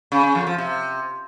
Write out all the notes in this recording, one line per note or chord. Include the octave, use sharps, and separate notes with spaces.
C#3
C#3
F2
F3
C3